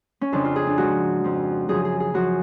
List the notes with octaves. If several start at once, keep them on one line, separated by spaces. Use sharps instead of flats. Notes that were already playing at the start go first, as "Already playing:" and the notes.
C#4
F2 C#3 F3 D4
F4
G#4
D4
G#2 F3 F#4
F2 F3
F#2 C#3 F3 G#4
G#4
G#4
F#2 F3 F#4